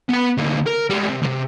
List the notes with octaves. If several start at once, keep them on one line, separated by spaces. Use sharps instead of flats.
B3 B5
D2 A#3
A#4
G3 G#3
C3
D2 C3